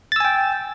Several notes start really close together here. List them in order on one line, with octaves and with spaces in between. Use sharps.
A6 E6 G#5 G5